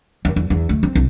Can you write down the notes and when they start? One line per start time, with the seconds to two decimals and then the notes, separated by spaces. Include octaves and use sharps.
0.25 D#2
0.36 E2
0.50 E2
0.69 D2
0.83 C4
0.95 C2